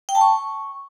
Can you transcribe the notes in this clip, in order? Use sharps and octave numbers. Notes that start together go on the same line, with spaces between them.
G5
A5
C#6